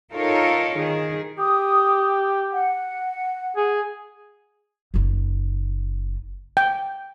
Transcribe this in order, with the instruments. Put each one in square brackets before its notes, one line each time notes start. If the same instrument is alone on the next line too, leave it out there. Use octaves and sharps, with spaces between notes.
[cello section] D#4 F4 A4 A#4 C#5
D#3 G#4
[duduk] G4 [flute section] D#6
[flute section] F#5
[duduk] G#4
[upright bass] F#1 D#4
[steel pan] G5